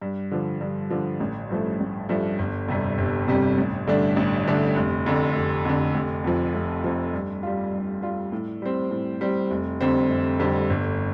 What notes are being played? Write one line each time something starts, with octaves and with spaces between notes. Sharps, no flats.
G2
D3 F3
G2
D3 F3
A1
G2 F3 A3
A1
G2 F3 A3
G1
F2 C3 G3
G1
F2 C3 G3
A1
G2 D3 A3 D4
A1
G2 D3 A3 D4
F1
F2 D3
F1
F2 D3
F1
F2 F3
F1
F2 F3
G2
G3 F4
G2
G3 F4
A2
G3 C4
A2
G3 C4
F1
F2 D3 G3 C4
F1
F2 D3 G3 C4
G1